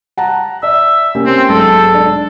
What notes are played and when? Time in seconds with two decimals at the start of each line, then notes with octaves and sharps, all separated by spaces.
0.17 F#5 A5 A#5
0.63 D5 E5
1.15 A#3 C#4 G4
1.26 C4
1.49 B1 G#2 A4
1.94 D4